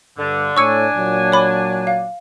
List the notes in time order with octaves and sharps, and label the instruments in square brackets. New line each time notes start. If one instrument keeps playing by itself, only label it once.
[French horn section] G2 [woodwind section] D3
[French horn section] A2 C#5 [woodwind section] D4 G#5 [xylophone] C#6 E6 C#7
[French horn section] A#2 F#3
[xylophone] C#5 B5 D6
F5